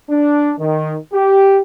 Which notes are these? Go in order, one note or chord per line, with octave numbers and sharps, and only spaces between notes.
D4
D#3
G4